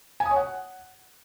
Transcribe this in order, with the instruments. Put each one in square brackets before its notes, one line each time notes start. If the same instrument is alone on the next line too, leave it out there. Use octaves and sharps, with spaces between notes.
[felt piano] G#5
D#6
C#5
F#5